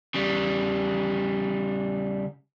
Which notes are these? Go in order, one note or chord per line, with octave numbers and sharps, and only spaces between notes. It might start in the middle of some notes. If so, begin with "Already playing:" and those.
C#3 G3